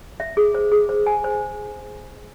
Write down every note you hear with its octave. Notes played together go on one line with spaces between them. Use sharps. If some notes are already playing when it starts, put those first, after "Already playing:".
E5
G#4
C5
G#4
C5
G#5
C5